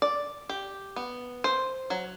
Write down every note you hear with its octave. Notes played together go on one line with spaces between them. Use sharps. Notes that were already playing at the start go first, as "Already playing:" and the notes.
D5
G4
B3
C5
F#3